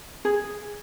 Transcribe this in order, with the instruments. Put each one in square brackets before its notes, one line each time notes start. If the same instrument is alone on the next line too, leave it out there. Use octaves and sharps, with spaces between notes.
[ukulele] G#4